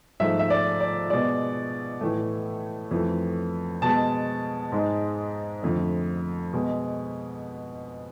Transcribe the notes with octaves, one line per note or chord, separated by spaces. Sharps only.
G#2 F3 A3 E5
E5
D5
D5
B2 G#3 D5
A2 E3 A3
F2 E3 A3
B2 G#3 A5
G#2 G#3
F2 D3 A3
B2 G#3